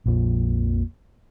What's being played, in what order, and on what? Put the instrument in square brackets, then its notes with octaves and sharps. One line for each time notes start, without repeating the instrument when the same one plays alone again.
[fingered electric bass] A#1 F2 A#2